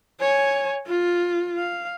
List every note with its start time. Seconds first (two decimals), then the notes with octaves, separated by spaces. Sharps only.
0.20 C#5 G#5
0.87 F4
1.58 F5